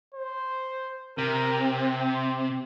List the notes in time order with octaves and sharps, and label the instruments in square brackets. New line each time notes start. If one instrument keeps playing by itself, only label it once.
[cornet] C5
[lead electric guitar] C3 [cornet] A#4
[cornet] C4